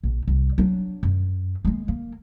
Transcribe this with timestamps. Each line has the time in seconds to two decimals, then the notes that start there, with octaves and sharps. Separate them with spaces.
0.03 A#1
0.28 C2
0.58 F#3 D4
1.03 F#2
1.65 G#3 A#3
1.88 A#3